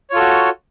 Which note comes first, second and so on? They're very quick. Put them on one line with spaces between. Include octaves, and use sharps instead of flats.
C#5 F4 A4 F#4